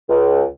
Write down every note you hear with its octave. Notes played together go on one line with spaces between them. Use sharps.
C#2